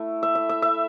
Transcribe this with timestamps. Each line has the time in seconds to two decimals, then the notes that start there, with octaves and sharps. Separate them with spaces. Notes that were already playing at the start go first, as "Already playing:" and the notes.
Already playing: A3 E4
0.23 E5
0.35 E5
0.49 E5
0.62 E5